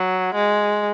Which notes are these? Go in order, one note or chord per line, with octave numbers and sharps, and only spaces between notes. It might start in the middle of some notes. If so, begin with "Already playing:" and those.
Already playing: F#3
G#3